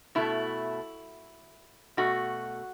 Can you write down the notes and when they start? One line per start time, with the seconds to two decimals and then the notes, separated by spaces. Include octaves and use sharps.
0.15 B2 A3 E4
1.97 B2 A3 F#4